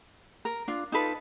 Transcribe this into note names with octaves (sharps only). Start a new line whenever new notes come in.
A#4
D4 F4
D#4 F4 A4 B4